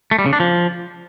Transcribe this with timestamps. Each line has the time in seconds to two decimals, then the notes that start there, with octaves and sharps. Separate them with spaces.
0.11 A3
0.19 G3
0.26 C#3
0.33 D4
0.40 F3